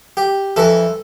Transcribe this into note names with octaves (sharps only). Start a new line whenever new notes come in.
G4
F2 E3 A4